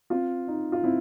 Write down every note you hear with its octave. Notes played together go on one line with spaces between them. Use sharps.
C4 F4
D#4
F4
C4 E4